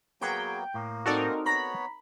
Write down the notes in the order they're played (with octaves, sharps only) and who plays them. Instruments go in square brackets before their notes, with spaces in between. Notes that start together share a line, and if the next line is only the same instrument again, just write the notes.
[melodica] F#3 A#3 B3 [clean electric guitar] F#4 G#4 B4 [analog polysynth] G5
[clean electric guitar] A2 [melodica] A#3
[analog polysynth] C4 D#4 A#4 [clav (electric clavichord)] F#4 A4 D5
[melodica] B3 C#5 [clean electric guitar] A#5 [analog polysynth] B5